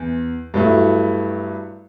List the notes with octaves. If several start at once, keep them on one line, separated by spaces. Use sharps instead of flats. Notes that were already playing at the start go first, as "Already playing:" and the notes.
Already playing: E2
G2 F#3 A3 E4